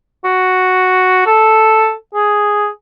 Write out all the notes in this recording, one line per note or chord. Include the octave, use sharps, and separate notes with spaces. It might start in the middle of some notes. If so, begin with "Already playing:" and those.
F#4
A4
G#4